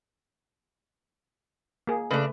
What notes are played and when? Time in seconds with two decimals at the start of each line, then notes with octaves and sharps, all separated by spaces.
1.87 A#3 G#4
2.11 C#3 A3 D4 B4